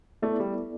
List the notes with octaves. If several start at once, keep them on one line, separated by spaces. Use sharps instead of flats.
A3 B3 E4 A4 D5
G3